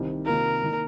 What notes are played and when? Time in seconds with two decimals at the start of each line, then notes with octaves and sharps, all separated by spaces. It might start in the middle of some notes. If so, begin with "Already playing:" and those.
Already playing: C2 C3 D#3 G3
0.26 C3 D#3 A#3 F4 A#4
0.63 D#3 A#3